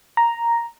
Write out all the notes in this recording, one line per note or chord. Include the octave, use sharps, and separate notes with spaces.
A#5